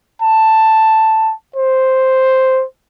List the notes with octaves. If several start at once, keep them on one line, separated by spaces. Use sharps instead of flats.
A5
C5